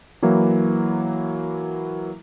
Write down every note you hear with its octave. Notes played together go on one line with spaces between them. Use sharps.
E3 F#3 A#3 E4